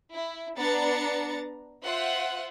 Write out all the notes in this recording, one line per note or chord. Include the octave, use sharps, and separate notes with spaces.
E4
B3 D4 A#5 A6 C#7
F4 C5 E5 F#5